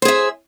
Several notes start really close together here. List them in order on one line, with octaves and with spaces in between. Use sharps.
C5 G#4 E5